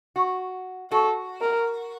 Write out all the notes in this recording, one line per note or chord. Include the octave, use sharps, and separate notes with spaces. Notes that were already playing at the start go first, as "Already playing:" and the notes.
F#4
F#4 A4
A#4